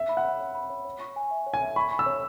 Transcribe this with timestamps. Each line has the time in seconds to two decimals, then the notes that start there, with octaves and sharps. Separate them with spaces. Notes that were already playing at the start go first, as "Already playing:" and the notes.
Already playing: E5
0.09 B5
0.17 F#5
0.24 C#5
0.40 C#5
0.55 B5
0.70 C#5
0.85 C#5
1.00 C#6
1.16 G#5
1.31 E5
1.46 C#5
1.54 G#5
1.62 E5
1.76 B5 C#6
1.91 C#6
1.99 E6
2.06 C#5